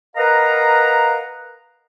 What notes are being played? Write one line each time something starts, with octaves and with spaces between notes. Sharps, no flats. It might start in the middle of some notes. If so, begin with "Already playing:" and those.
A#4 B4 D#5 F5 F#5 A#5